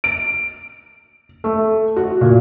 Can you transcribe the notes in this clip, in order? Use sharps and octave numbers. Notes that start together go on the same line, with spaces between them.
D7
A3
F#4
A#2